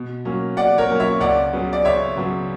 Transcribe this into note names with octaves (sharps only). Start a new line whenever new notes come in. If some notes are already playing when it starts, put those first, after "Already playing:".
Already playing: B2
F#3 A#3 C#4
B2 D5 F#5
A#4 C#5
F#3 A#3 C#4
C#5 E5
C#2 D5 F#5
C#3 F#3 B3
D5
C#2 C#5 E5
C#3 F#3 B3